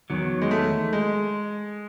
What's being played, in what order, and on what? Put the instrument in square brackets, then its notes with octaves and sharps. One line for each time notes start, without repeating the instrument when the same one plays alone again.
[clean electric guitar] E2 D#3 F#3
[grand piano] G#3
A3
G#3